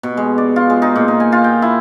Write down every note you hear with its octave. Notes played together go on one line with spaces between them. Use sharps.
B2
G#3
D5
F4
G#3
D#4
A#2
D#4
G#5
F4
G5
E4